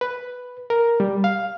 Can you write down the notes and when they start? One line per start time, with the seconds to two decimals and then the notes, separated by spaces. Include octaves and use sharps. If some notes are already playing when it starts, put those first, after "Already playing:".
0.01 B4
0.70 A#4
1.00 G3
1.24 F5